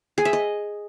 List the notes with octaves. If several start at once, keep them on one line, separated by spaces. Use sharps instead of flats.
G#4
E5
D#5